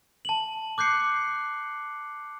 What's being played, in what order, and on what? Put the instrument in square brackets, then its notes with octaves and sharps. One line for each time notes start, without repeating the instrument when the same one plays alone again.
[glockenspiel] A5 F#7
D6 F#6 G6 C7 C#7